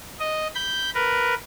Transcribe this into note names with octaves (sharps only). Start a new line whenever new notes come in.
D#5
B5 G6
A#4 B4